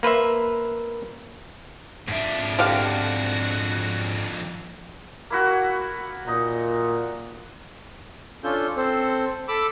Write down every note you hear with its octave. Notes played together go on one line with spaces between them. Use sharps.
A#3 B4 C5 E5
F2 G#2 D4 E5
D3 F#4 G4 F5
A#3 E4 F#4
A#2 D#4 D#5
C#4 D4 F4 A4 G6
C4 A4 C5
A4 B5 D6 E6